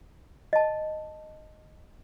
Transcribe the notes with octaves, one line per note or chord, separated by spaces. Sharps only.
D#5 A5